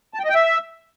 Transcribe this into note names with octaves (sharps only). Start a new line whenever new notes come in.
A5
G5
D#5
G5
E5